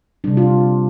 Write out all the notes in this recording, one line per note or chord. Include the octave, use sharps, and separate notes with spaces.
C3 G3 D4
F4